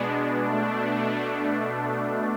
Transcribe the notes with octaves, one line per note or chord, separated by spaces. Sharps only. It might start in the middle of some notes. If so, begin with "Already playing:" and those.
Already playing: B2 G#3 B3 D4
B2 A3 D4